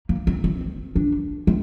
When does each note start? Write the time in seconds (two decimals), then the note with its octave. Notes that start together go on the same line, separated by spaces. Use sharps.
0.09 A#3
0.27 C4
0.44 C4
0.96 D4
1.47 C4